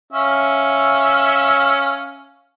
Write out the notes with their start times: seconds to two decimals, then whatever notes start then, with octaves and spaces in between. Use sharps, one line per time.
0.13 C#4 E5 F5